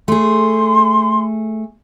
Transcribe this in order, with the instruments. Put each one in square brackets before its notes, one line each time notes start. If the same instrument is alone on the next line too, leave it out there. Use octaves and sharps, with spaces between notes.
[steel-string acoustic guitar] A3 G#4 [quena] C6